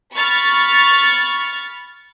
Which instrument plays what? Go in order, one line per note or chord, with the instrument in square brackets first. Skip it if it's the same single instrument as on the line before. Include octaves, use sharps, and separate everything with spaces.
[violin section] B5 C#6 F6 A6